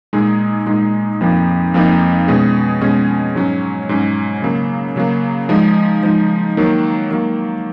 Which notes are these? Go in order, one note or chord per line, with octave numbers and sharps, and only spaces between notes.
A#2 G#3 D#4 G#4
A#2 G#3 D#4 G#4
F2 F3 A#3 D#4
F2 F3 A#3 D#4
B2 G#3 C#4 G#4
B2 G#3 C#4 G#4
G#2 F#3 C#4
G#2 F#3 C#4
C#3 F#3 A#3
C#3 F#3 A#3
F3 G#3 D#4
F3 G#3 D#4
D#3 F#3 A#3
D#3 F#3 A#3